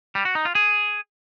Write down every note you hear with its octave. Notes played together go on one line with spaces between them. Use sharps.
G3
F#4
D#4
F4
G#4